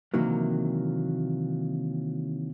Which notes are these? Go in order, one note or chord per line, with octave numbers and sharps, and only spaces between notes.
C3 D#3 E3 F#3 A#3